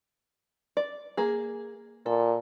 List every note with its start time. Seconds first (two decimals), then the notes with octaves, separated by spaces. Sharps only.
0.77 D5
1.17 A#3 G#4
2.06 A#2 A4